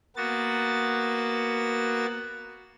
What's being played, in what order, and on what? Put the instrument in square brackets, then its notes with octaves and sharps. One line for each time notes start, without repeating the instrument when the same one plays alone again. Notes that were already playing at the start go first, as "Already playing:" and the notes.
[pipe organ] A#3 B3 F#4 A6